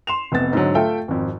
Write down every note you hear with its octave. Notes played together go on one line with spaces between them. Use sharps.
C6 E7 F7
F1 C3 B3 A6
G#2 D3 F#3
A3 F4 A4 E5 G5
G#1 F2